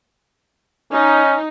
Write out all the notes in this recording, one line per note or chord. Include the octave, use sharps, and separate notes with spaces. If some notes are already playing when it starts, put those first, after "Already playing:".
C#4 D#4